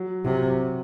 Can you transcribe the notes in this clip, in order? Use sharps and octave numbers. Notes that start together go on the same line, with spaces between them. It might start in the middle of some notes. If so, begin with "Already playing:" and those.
Already playing: F#3
C3 F#3